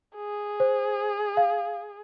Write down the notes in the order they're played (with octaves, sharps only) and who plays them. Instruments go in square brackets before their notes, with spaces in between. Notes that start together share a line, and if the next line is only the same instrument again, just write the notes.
[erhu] G#4
[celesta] C5
F5